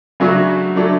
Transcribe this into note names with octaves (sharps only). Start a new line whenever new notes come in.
C#3 F#3 A3 D4 F#4
F#3 A3 D4 A4